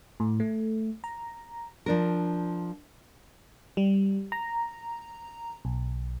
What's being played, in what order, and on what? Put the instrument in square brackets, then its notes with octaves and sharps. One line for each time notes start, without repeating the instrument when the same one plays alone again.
[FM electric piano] A2
A3
A#5
[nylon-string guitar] F3 D4 A#4
[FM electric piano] G3
A#5
B1